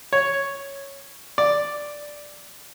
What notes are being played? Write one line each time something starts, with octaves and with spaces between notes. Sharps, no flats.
C#5
D5